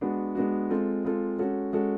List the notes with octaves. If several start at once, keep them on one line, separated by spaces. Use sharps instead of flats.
G#3 B3 D4 F#4
G#3 B3 D4 F#4
G#3 C4 F4 A4
G#3 C4 F4 A4
G#3 C#4 F#4 A4
G#3 C#4 F#4 A4